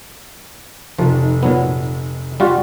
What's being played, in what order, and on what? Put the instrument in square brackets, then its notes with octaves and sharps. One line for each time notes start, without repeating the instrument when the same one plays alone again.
[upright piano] F1 D#3 A4 [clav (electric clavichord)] F3
[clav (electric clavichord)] A#2 F#3 B3
G3 F4 F#4